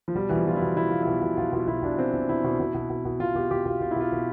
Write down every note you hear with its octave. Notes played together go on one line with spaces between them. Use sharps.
F3
B2 G3
B2 E3
F3
B2 F4
E4
B2
B2 E4
B2 F4
B2 E4
B2
B2 F4
B2 F4
B2 E4
B2 D4
B2 C4
B2
B2 E4
B2
B2
B2
B2
B2
B2 F4
B2 G4
B2 G4
B2 F4
B2 F4
E4
B2 F4
B2